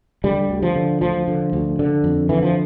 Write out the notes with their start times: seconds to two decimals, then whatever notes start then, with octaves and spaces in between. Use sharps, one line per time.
0.24 D3 G3
0.50 D2
0.62 F3
0.76 D3
1.01 D2 F3
1.28 D3
1.53 D2
1.79 D3
2.04 F2
2.29 D3 E3
2.43 F3